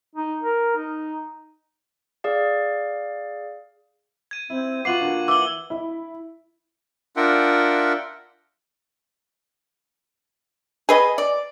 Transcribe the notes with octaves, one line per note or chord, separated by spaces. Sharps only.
D#4
A#4
D#4
G#4 D5 F5
G#6 D#7
C4 E4
B3 F4 F#4 F#5 D6 C7 D#7 F#7
D3 A#3
E3 D6 E6 G7
E4
D4 F4 A#4 E5 F#5 G5
G#4 B4 D#5
D5